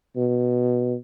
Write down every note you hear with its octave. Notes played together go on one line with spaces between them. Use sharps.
B2